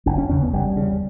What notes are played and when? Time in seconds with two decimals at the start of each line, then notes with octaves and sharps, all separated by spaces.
0.06 F#1 C#4
0.18 C#4
0.29 E2 C#3 C#4
0.42 B3
0.53 F#1 G3
0.77 E2 C#3